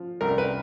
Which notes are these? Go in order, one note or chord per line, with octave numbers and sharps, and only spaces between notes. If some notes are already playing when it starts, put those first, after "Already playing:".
Already playing: F3
C2 A#4
B4